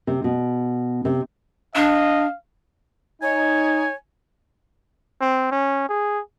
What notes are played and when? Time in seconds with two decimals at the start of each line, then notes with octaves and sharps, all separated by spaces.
0.07 C3
0.24 B2
1.05 C3
1.75 D4 D#5 F5
3.22 D#4 C#5 G#5
5.21 C4
5.52 C#4
5.89 G#4